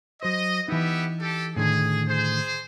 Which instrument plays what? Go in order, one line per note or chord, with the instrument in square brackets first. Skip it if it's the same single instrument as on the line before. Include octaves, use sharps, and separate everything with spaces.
[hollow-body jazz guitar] F#3 C5 [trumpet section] D#5
[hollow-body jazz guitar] E3 D#4 [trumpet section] B3 G4 E5
[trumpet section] G4 A4
[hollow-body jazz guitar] A2 D3 D#3 [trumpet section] G#4
[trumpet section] G#4 C5